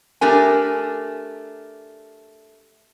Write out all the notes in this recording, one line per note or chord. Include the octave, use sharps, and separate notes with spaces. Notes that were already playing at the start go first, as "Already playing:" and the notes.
A3 D4 G4 A#4 G#5